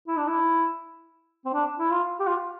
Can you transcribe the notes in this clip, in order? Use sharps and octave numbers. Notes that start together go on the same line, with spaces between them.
E4
D4
E4
C4
D4
E4
F4
G4
F4